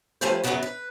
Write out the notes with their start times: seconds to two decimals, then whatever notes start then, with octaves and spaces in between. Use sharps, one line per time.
0.21 F3 G3 A3 C#4 B4 C5
0.44 F#2 C#3 E3 F#3 B3 C#4
0.63 B4